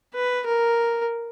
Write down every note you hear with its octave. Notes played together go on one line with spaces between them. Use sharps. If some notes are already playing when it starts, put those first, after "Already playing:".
B4
A#4